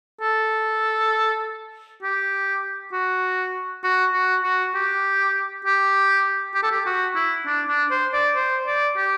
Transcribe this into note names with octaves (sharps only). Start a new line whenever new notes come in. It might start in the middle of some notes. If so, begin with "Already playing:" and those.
A4
G4
F#4
F#4
F#4
F#4
G4
G4
G4
A4
G4
F#4
E4
D4
D4
C5
D5
C5
D5
G4